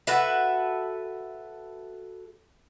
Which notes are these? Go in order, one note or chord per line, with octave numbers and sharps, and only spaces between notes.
F#4 A4 B4 E5